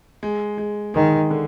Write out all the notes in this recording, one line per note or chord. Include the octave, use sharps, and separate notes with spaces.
G#3
G#3
D#3 G#3
D3